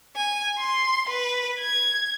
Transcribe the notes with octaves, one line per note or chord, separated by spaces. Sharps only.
G#5
C6
B4
G#6